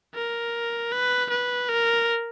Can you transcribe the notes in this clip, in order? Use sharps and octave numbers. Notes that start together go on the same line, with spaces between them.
A#4
B4
B4
A#4